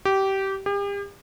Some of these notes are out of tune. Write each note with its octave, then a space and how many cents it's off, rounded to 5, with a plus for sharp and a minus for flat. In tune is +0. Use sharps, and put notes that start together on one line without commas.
G4 -20
G4 +40